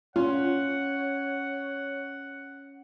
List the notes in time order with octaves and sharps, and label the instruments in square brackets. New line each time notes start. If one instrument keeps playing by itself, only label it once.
[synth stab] A#2 F4 [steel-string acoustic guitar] C#4 [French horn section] C#5 [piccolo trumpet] F#5